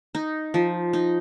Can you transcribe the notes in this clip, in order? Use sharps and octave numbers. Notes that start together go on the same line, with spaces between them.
D#4
F3
D#4